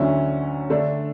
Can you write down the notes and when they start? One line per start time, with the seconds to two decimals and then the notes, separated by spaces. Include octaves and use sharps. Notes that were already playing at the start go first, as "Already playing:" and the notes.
Already playing: D2 D3 F#3 C#4 E4
0.70 D3 A3 D4